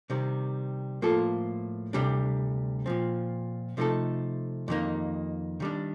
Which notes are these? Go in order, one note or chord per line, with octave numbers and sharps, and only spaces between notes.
C3 D#3 G3 C4
A2 F3 A#3 F4 A4
D2 C3 G3 D4
A#2 F3 C4
C3 F3 A3 D#4 A4
F2 D#3 A#3 D#4
D#3 G3 D4